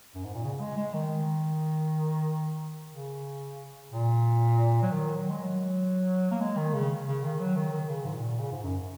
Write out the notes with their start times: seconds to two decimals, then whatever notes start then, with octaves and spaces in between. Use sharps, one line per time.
0.15 F#2
0.24 G#2
0.35 A#2
0.44 C#3
0.61 G#3
0.77 G#3
0.94 D#3
2.92 C#3
3.92 A#2
4.82 F#3
4.92 D#3
5.16 F#3
5.30 G#3
5.43 F#3
6.31 A#3
6.41 G#3
6.57 D#3
6.73 C#3
7.06 C#3
7.24 D#3
7.40 F#3
7.57 D#3
7.73 D#3
7.89 C#3
8.05 G#2
8.14 A#2
8.39 C#3
8.52 G#2
8.64 F#2